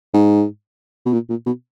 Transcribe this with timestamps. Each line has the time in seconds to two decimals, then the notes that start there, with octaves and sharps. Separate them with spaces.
0.14 G#2
1.06 B2
1.13 A#2
1.30 A#2
1.47 B2